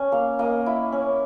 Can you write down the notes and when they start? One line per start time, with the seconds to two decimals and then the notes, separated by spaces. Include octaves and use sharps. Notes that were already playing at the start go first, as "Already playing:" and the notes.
Already playing: C#4
0.12 A#3 F5
0.39 A#3 D#5
0.66 E4
0.92 C#4